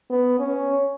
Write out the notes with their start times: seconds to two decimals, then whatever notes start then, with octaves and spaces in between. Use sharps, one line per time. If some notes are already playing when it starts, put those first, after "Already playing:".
0.11 B3
0.40 C#4